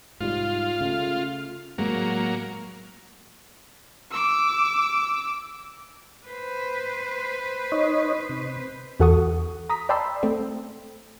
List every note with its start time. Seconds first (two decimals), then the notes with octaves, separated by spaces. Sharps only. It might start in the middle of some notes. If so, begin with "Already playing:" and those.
0.20 G#2 C3 G3 F4
0.81 C#3 A3
1.78 A2 F#3 G#3 A#3 C4
4.11 D6 E6
6.27 B4 C5
7.72 D#4 C#5 D#5
8.29 C3
9.00 E2 F#4 A4 F#5 C#6 D#6
9.70 A#5 D#6 B6
9.89 D5 G5 A5 B5 C6 E6
10.23 A3 C4